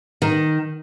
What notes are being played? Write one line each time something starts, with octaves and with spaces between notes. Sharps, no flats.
D#3